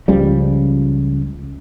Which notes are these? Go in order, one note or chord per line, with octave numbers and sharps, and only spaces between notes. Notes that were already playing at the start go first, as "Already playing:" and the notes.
C#2 C#3 F3 G3